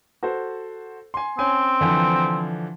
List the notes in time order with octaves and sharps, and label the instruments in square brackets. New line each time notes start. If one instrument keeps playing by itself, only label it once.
[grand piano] F#4 A4 C5
G#5 C6
[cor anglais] C4 [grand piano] C#4 G#5
[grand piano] D3 E3 F3